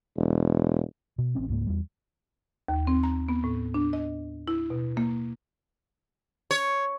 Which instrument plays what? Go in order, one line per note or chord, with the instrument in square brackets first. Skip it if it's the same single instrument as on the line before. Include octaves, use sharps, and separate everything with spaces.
[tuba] E1
[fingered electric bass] B2
A1 C4 C#4
C#2 G#2 A#3
E2 G3
[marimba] D#2
C4
A#5
B3
A2
D4
D#5
E4
B2
A#3
[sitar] C#5